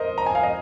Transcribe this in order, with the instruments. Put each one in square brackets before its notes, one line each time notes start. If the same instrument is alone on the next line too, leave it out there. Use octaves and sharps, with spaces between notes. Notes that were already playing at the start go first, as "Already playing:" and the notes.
Already playing: [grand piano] A#4 C5 D#5
A#5
G#5
F5
D#5